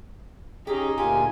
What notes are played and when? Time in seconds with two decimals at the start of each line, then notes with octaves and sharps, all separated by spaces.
0.67 C#4 D#4 G4 G#4
0.98 D2 A#2 F4 G4 G#5